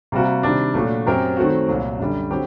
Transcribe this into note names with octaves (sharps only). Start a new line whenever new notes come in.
C3 G3 A#3 F#4
C3 D#3 G3 D4
A#2 F#3 A3 D4 F#4
F#2 F#3 C4 G4 A#4
D#3 F#3 A3 C4 F#4
C2 A#2 F#3
F#2 D3 G3
D3 F#3 C4 G4